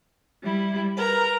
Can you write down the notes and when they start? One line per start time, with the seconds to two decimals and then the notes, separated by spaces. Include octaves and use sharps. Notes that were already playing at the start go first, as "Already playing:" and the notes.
0.42 G3 E4
0.98 A#4 B4 A#5